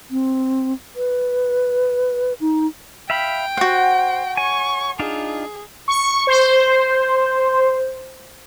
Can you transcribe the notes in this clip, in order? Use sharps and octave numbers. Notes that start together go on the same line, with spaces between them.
C4
B4
D#4
E5 F5 G5 B5
F#4 C5 F#5
C#5 G#5 C#6
D4 D#4 F4 G#4
C#6
C5